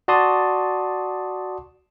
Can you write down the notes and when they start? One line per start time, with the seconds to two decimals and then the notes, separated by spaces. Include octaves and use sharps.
0.08 F#4 D5 A5 C6 D#6